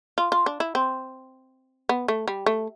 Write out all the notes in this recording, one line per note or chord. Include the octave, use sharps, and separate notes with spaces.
F4
F4
D4
E4
C4
B3
A3
G3
A3